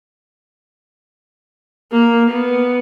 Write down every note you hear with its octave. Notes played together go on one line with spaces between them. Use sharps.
A#3
B3